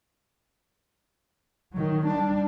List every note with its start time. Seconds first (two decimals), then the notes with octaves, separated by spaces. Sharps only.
1.73 D#3 F#3
2.06 G3 D4